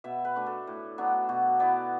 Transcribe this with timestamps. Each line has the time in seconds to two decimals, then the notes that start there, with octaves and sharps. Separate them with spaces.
0.04 B2 E5
0.25 B4
0.36 A3 D4
0.46 A4
0.67 A2
0.98 F#3 B3 D4
1.29 B2 F#4
1.59 B3 E4 D5